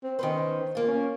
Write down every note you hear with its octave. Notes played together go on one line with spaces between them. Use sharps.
C4
D#3 C#4 B4 C5
A#3 F4
C#4